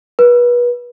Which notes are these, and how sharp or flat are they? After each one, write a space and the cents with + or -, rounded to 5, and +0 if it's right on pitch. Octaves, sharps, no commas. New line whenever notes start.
B4 -30